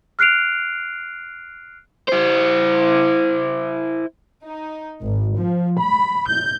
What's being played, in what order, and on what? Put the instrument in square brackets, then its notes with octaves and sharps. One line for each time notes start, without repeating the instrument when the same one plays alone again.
[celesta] F6 F#6 C7 D7 F7
[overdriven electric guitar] E4 C5
[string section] D#4
G#1
F3
B5
G6